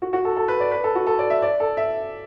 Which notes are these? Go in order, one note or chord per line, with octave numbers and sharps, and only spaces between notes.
F#4
F#4
A4
A4
B4
D5
B4
A4
F#4
A4
D5
E5
D5
A4
E5